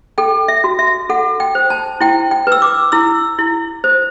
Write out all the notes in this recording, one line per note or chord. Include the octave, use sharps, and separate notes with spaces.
A4 G5
E5
F#4
E5
A4 F#5
G5
C5
A5
E4 G5
G5
B4 E6
D6
E4 E6
E4
C5